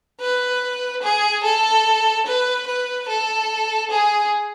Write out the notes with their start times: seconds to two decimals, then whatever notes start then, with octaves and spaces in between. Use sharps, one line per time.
0.21 B4
1.03 G#4
1.43 A4
2.26 B4
2.67 B4
3.09 A4
3.91 G#4